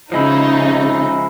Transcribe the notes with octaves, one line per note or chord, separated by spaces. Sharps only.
C#3 F3 G#3 D#4 E4